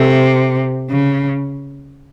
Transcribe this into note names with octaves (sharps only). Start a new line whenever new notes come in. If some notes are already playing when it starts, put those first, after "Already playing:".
Already playing: C3 A4 C5 E5
C#3